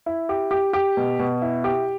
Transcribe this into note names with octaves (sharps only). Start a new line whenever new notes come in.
E4
G4
G4
G4
B2
B2
E4
G4